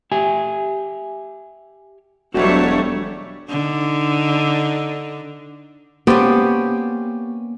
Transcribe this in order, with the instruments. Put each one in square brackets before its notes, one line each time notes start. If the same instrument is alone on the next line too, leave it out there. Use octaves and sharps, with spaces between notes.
[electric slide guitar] G4 E5 G#5
[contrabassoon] E1 [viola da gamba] F#3 G3 D4 [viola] A3 C#5 [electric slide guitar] F#4 C5
[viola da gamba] D3 D#4
[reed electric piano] A#3 [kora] B3 C5 D5 [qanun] C#4 G4